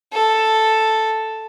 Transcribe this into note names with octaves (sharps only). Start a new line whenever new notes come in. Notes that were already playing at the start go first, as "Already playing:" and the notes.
A4